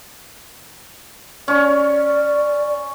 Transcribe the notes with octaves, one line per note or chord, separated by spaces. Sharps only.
C#4 D5 C#6